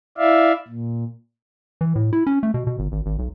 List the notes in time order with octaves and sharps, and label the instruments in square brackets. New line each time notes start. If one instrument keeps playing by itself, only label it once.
[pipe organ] E4 D5 E5 F5
A#2
[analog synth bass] E3
A2
E4
C#4
A3
B2
B2
G1
G#1
G#1
B1